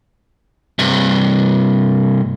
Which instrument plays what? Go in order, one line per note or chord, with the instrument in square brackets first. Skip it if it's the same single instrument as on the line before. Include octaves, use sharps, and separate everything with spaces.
[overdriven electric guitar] G2 C3